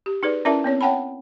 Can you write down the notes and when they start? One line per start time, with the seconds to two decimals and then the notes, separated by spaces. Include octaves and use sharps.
0.06 G4
0.23 D#4 G#4 B4 D5
0.45 C#4 E4 A#4 D5 E5 A5
0.64 B3 C4 C#5
0.81 C#5 F#5 G5 A5 B5